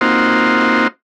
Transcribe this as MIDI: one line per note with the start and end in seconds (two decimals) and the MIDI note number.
0.01 0.87 58
0.01 0.87 60
0.01 0.87 63
0.01 0.87 65
0.01 0.87 66
0.01 0.87 72